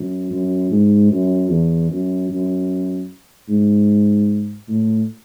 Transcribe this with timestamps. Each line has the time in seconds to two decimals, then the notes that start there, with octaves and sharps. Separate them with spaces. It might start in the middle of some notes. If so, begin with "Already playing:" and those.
Already playing: F#2
0.31 F#2
0.71 G#2
1.11 F#2
1.50 E2
1.91 F#2
2.30 F#2
3.49 G#2
4.68 A2